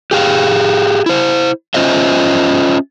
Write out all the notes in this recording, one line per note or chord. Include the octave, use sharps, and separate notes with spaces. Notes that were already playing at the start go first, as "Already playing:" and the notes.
G4 G#4 F5 G5
E4 C5
C#4 F4 C5 D#5 E5